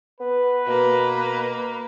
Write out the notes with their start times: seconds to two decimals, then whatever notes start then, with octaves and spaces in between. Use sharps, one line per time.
0.20 B3 B4
0.67 B2 A#3